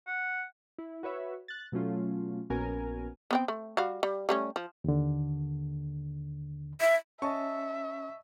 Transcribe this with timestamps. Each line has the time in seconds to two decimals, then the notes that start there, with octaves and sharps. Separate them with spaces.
0.07 F#5
0.78 E4
1.03 F#4 B4 C#5 E5
1.48 F#6 A6
1.72 B2 F#3 A3 C#4 F4
2.50 A#1 B3 C#4 F#4 A#4 G#5
3.31 B3 C4 G5
3.48 A3
3.77 G3 F#4 F5
4.03 G3
4.29 G3 A3 C#4
4.56 F3
4.84 D#2 D3
6.81 E5
7.22 C#4 D#5 E5 A5 C#6